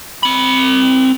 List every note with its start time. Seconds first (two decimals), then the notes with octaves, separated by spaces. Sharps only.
0.23 C4 B5